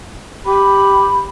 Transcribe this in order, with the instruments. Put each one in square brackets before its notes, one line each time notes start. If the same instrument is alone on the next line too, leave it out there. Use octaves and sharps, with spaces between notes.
[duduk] G4 [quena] B5